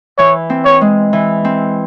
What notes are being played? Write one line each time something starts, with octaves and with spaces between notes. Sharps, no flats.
E3 C#5
C4
C#5
G#3
E3
C4